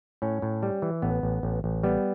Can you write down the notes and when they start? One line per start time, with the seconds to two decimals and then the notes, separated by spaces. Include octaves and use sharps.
0.22 A2 C#4
0.42 A2
0.63 G3
0.82 E3
1.02 A1 B3
1.23 A1
1.43 A1
1.64 A1
1.83 G3 B3